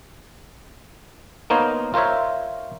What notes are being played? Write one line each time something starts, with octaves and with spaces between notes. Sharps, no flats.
A#3 B3 D#4 A#4 C5 C#5
F4 A#4 C5 C#5 E5